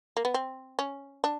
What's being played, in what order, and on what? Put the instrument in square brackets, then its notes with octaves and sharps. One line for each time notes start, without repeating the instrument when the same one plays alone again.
[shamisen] A#3
B3
C4
C#4
D4